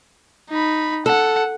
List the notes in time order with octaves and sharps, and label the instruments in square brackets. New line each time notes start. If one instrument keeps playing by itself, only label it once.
[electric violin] D#4 B5
[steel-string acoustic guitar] A4 [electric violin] F#5